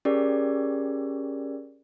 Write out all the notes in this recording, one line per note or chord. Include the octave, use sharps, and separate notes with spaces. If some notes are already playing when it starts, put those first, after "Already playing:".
C#4 G4 G#4 A#4 D5